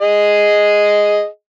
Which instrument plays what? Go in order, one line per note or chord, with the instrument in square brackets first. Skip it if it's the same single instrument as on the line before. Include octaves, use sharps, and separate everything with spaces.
[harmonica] G#4 D#5